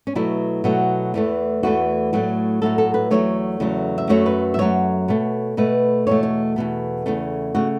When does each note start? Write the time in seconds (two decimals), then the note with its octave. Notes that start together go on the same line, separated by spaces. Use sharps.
0.07 C#4
0.15 B2 F#3 A3 E4
0.64 B2 F#3 A3
1.14 E2 E3 A3
1.63 E2 E3 A3 F#4
2.13 A2 F#3 A3
2.62 A2 F#3 A3 A4
2.78 A4
2.94 B4
3.11 E2 C#3 F#3 A3 C#5
3.60 E2 C#3 F#3 A3
3.98 E5
4.09 F#2 F#3 A3 C#5
4.26 B4
4.54 E5
4.59 F#2 F#3 A3 C#5
5.08 B2 A3
5.57 B2 A3 B4
6.07 E2 B2 A3 C#5
6.23 C#5
6.56 E2 B2 A3
7.06 E2 C#3 A3
7.55 C#3 A3 F#4